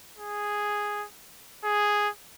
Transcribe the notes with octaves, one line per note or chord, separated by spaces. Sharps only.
G#4
G#4